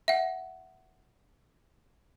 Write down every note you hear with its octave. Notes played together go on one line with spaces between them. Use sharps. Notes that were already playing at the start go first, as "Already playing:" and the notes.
E5 F#5